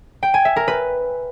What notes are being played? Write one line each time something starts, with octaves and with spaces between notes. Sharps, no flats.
G5
G#5
E5
A#4
B4